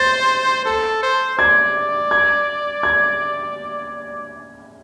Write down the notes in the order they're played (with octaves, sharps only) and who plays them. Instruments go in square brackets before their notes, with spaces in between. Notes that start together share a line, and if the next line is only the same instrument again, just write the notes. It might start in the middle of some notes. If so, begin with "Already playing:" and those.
Already playing: [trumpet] C5 [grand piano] A6
[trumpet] A4
C5
[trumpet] D5 [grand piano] G#6
[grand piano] G#6
G#6